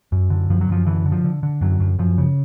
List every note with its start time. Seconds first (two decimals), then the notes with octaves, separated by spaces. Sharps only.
0.12 F#2
0.30 D3
0.50 F#2 F3
0.61 F#3
0.69 F#2 F3
0.86 D3 E3
1.06 D3
1.12 F3
1.24 D3
1.43 D3
1.61 F#2 F#3
1.80 F#2
1.99 F#2 F3
2.18 C#3